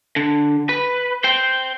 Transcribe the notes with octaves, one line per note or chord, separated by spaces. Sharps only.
D3
B4
C5 G5